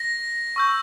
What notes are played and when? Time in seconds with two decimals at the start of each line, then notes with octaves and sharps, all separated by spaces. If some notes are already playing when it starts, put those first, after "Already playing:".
Already playing: A#6
0.56 C#6 E6 G6